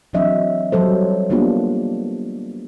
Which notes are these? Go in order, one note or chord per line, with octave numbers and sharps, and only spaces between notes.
E3 F#3 C4 D4 D#5 E5
F#3 G3 A4 C5
A#3 B3 D4 F4 G4